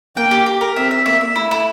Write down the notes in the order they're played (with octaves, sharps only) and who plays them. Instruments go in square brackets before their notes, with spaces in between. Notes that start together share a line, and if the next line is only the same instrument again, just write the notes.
[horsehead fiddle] A#3 [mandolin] G5
[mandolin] G4
G4
A#4
[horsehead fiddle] C4 [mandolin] E5
[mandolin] E5
[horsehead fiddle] A#3 [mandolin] E5
[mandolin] E5
[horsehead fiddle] A3 [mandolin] E4
[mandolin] E4